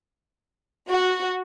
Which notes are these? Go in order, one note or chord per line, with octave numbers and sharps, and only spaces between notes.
F#4